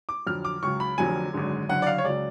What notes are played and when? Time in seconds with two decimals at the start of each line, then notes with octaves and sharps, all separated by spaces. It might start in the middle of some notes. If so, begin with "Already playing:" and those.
0.09 D6
0.27 F2 D3 F#3 F6
0.45 D6
0.63 C#2 C#3 F#3 C#6
0.80 B5
0.98 F1 F2 D3 F#3 G#5
1.33 G#1 F#2 D3 G#3
1.69 F#1 F#2 D3 F#5
1.82 D5
1.87 F5
1.98 C#5
2.04 C#2 C#3 F#3 D5